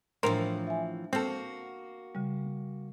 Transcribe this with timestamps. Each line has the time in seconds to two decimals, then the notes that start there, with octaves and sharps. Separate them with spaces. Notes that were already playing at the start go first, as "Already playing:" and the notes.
0.23 A2 E3 F3 D4 A#4 C5
0.67 E5 G#5
1.13 A#3 C4 F#4 A4
2.15 C#3 G3